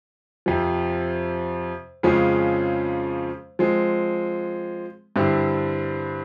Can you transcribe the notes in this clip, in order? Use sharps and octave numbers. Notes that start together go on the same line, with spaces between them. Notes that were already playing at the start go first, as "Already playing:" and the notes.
F2 C3 F3
F2 C#3 F3 G#3 C#4
F3 G#3 C4
G2 D3 G3 C4 E4